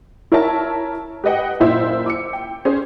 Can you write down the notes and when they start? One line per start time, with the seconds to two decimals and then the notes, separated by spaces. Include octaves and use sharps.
0.32 E4 A#4 C#5 E5 A5
1.24 G4 B4 D#5 F#5 G5
1.60 F#1 A#2 E4 C5 E5 E6
2.06 D6 E6 C#7
2.33 G5
2.65 C#4 G#4 C5